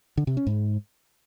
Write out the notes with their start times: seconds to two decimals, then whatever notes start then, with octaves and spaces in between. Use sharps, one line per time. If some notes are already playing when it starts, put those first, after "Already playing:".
0.18 D3
0.27 C3
0.37 C#4
0.47 G#2